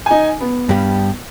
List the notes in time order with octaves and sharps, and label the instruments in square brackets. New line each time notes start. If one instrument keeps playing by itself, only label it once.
[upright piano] D#4 G#5
B3
[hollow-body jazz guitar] G2 G3